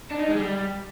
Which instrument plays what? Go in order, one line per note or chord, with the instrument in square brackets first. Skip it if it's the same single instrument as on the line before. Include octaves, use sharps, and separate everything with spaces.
[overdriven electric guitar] D4
D#4
G#3
G3